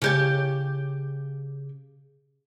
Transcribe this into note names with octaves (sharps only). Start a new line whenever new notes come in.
C#3 G4 C#5